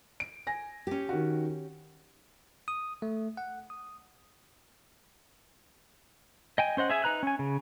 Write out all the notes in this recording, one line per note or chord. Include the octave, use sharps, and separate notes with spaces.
D7
G#5 A#6
C#4 G4
D#3 F#4
D#6
A3
F#5
D#6
D#5 G5 G#5
C#4 C5 D#5 F#5
G#4 E5 G#5
D#4 B4 A#5 F#6
C#4 G#5
C#3